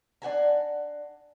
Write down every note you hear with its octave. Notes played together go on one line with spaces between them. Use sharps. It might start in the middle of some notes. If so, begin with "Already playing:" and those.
D4 F#5 G#5 A#5